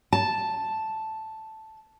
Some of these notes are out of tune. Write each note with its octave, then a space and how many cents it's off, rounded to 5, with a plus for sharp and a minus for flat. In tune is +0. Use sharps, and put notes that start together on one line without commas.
A5 +0